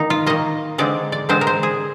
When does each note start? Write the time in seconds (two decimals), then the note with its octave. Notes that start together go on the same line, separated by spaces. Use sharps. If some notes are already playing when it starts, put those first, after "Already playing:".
Already playing: D#3 A#3 D#4
0.10 F4
0.26 D#3 A#3 D#5
0.78 D3 G#3 C4 D5
1.12 D5
1.29 D3 G#3 C4 C5
1.41 A#4
1.47 C5
1.63 G#4